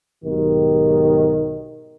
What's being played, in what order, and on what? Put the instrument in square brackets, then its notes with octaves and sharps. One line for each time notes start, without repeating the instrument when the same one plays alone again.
[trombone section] B1 G#2 D#3 G4